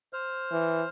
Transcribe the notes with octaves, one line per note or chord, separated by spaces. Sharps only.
C5 F6
E3